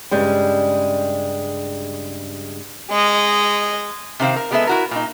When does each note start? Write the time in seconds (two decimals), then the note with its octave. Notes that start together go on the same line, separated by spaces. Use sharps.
0.11 G2 C#3 G3 G#3
2.90 G#3 D#5
4.20 C3 D#3 C4 F5
4.36 A#4
4.51 G3 G#3 B3 G#4 A4 E5
4.67 E4 F#4 A#4
4.91 A#2 D#4